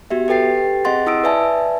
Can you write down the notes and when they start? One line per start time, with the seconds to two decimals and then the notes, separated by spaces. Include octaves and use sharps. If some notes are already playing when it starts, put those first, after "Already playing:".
0.10 B3 F#4 G4 E5
0.28 G4 A4 B4 G5 A6 C7
0.85 C4 G#4 D#5 F#5 C6 A6
1.06 E4 D#6 E6 D7
1.24 B4 D5 E5 G#5 A5